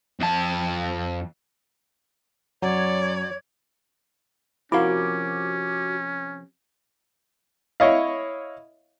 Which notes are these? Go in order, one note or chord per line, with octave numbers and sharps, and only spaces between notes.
F2 A5
F#2 F#3 C#5 D5 G#6
C3 F3 C#4 E4 F#4 A#4 F5 D6
E4 C#5 D#5 F5